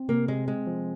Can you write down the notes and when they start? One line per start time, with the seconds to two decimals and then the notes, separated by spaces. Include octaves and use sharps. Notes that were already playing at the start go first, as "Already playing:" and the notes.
Already playing: C4
0.08 C3 A#3
0.28 C3 G#3
0.48 G#3 C4
0.67 F3